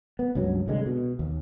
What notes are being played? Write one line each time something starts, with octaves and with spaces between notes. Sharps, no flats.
B3
C#2 G2 F#3
C2 D3 G#3
B2
D#2